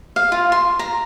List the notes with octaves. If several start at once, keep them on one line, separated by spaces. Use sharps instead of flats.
F5
F4
C6
A#5